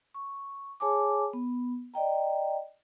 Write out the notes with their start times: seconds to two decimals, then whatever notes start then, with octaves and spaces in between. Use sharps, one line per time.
0.14 C#6
0.80 G#4 C#5 G#5 A5 D6
1.33 B3
1.94 D5 D#5 G5 A#5